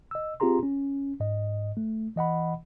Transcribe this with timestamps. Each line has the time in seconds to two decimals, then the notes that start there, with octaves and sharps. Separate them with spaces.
0.11 D#5 E6
0.40 C4 F4 G4 G#4 A#5 C6
0.63 C#4
1.20 G#2 D#5
1.77 A3
2.16 E3 D#5 F#5 B5